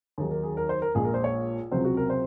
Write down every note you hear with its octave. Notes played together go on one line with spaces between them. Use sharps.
D#2 D#3 F#3 G#4
A#4
G#4
A#4
C5
A#4
A#1 A#2 G#3 G#4
A#4
C5
C#5
C#2 C3 F#3 C4 C5
F#4
A#4
C5